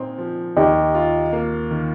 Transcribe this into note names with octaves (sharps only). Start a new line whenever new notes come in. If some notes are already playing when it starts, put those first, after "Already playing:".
Already playing: A#2 C4 D#4
F3
D#2 D#4 G4
F4
A#3
D#3